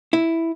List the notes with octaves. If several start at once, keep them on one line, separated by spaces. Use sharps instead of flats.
E4